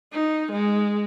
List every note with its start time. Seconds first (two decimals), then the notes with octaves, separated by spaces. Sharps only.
0.13 D#4
0.52 G#3